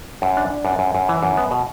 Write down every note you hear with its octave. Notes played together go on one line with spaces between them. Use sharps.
F#2
D4
D4
F#2
F#2
F#2
E3
F#2
B3
B2